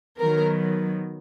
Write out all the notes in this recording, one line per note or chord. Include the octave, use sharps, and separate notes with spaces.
D#3 F#3 B3 A#4